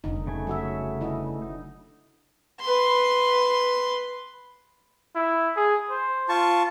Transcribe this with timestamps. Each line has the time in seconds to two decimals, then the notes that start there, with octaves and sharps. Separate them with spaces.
0.04 F1 D3 G3 D#4
0.27 C#3 A3 G#5
0.47 F#3 F#4 E5
1.01 D3 E4 D#5
1.42 D#4
2.61 B4 C6
5.15 E4
5.56 G#4
5.90 C5
6.29 F4 A5 C#6